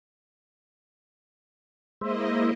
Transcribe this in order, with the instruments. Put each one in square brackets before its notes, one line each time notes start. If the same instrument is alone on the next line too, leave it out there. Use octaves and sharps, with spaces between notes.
[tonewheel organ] G#3 C5 E5 [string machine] A#3 E4 D#5